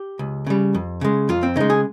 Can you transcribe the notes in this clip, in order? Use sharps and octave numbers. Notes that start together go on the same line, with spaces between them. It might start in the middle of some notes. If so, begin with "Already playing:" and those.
Already playing: G4
C#2
C#3 G3
F2
C#3 G#3
F2 F4
C4
C#3 G#3 D#4
G#4